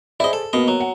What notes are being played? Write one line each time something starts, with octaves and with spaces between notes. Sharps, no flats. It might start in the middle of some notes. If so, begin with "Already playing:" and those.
E4 G#4 C5 D5 D#5
A4
B2 A#3 B3 D#5
F#3
F#5